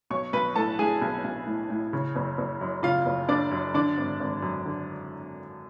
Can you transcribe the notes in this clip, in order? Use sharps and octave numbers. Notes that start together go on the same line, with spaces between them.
B1 C#5 C#6
B1 B4 B5
A2 A4 A5
A2 G#4 G#5
B1
B1
A2
A2
C#3
F#1
F#1
F#2
C#3 F4 F5
F#1
F#1 D4 D5
F#2
D3 D4 D5
G#1
G#1
F#2
D3